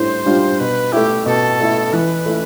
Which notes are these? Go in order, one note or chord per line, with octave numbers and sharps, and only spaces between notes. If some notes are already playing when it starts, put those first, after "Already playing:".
Already playing: A2 G3 D4 C5
G3 D4 F4
B2 B4
A3 E4 G4
B2 A4
A3 E4
E3 B4
A3 E4